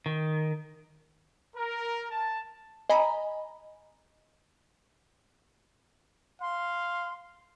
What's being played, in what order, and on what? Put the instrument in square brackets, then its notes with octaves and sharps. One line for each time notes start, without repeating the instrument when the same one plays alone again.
[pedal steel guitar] D#3
[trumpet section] A#4
A5
[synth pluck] D#5 G#5 A#5 B5
[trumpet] F5 [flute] C6